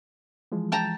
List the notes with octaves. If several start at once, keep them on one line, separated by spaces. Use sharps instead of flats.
E3 F3 G#3
G5 A5 A#5